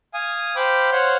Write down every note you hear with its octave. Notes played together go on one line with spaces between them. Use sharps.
F5 G#5 D#6
C5 F5 G5 B5 D6
C5 C#5 F5 F#5 C6